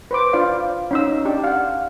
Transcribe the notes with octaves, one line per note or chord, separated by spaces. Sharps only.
B4 C5 D6
D4 F4 C5 D5 F5
C#4 D#4 E6
D4 G4
F5 F#5